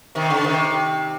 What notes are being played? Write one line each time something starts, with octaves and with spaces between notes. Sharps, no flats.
C3 D#3
C#3
C3 D#3